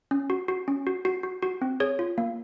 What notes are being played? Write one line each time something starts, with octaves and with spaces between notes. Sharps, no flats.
C#4
F#4
F#4
C#4
F#4
F#4
F#4
F#4
C4
G#4 C#5
F4
A#3